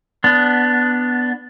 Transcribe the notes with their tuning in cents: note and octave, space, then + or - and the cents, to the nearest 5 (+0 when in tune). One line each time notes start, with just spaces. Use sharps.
B3 +5 D4 -5